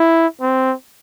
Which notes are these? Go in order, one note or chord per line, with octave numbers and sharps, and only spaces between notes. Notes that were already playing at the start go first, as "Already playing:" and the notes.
Already playing: E4
C4